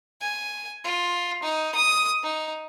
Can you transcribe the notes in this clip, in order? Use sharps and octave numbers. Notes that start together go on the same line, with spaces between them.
G#5
F4
D#4
D#6
D#4